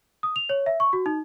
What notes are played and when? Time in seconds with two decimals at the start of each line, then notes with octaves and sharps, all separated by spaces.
0.23 D#6
0.36 F7
0.49 C#5
0.66 E5
0.80 C#6
0.93 F#4
1.06 D#4